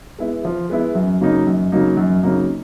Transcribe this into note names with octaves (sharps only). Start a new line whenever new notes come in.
G#3 B3 E4
F3
G#3 B3 E4
F#2
C#3 F#3 A#3 D#4
F#2
C#3 F#3 A#3 D#4
F#2
C#3 F#3 A#3 D#4